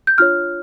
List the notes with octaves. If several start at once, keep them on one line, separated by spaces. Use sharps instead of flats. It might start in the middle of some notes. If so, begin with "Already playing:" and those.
G6
D4 F4 C#5 F6